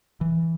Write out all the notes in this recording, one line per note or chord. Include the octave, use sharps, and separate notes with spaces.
E3